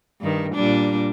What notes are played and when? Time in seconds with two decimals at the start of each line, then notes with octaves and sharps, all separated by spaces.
0.21 G2 D#3
0.54 A#2 G3 D4